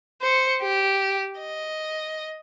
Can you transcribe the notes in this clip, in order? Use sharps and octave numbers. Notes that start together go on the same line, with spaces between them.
C5 C#7
G4
D#5